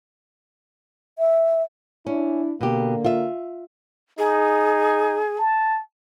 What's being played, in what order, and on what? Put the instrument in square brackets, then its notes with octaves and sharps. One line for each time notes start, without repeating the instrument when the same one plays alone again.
[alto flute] E5
[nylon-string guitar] C#4 [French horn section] D4 E4
[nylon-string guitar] B2 G4 [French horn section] D3 A#3
[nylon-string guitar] F4 E5
[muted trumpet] D#4 [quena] G#4
[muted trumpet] A5